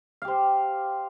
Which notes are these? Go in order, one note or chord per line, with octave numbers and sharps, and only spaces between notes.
G4 C5 F5